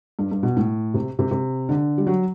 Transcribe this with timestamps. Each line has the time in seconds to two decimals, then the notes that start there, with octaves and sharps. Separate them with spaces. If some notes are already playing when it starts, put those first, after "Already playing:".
0.19 G2
0.31 G2
0.43 B2
0.57 A2
0.94 C3
1.19 C3
1.31 C3
1.69 D3
1.98 G3
2.07 F#3